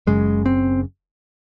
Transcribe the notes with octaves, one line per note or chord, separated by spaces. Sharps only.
F#1 F#2 C#3 G#3
C4